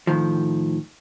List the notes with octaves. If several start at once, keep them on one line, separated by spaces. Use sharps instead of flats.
A2 D#3 F3